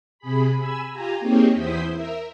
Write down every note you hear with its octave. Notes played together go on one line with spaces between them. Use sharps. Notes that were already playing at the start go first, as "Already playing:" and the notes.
C3 G#4 B5
G#5 B5 E6
F4 G4 G#5 A#5
A#3 C4 D#4 G4 G#4 C#5
E2 E4 C5 D#6 G6 B6
A#4 E5